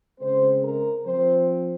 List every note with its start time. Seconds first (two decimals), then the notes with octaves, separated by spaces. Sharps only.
0.21 C#3 G#3 C4 C5
0.63 A#4
1.05 F3 C4 C5